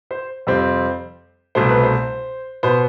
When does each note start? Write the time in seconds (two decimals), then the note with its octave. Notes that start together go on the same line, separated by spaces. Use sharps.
0.11 C5
0.47 F2 C3 G3 C4
1.55 C2 B2 A3 C5
1.69 B4
1.83 C5
2.63 B2 B3 C5